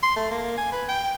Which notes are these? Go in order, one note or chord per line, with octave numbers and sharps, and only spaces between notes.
C6
A3
A#3
G#5
B4
G5